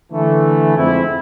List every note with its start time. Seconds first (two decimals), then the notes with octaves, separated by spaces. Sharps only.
0.12 D3 E3 A3
0.76 F2 G#2 C4 E4